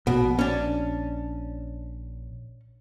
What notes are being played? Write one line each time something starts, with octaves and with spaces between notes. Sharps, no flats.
A#1 B2
C#4 D4